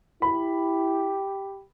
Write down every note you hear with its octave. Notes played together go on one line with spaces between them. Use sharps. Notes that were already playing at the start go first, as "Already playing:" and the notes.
E4 G4 B5